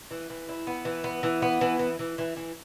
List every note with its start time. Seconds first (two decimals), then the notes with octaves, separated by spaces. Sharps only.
0.11 E3
0.30 E3
0.49 E4
0.67 B3
0.85 E3
1.04 B3
1.23 E3
1.42 B3
1.61 E3
1.79 E3
1.99 E3
2.18 E3
2.36 E3